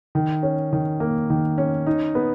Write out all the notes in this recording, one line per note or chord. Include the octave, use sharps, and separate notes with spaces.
D#3
C#4
D#3
A#3
D#3
C#4
D#4
B3